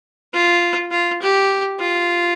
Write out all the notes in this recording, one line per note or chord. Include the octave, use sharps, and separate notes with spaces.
F4
F4
G4
F4